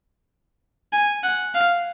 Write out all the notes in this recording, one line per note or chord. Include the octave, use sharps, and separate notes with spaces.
G#5
F#5
F5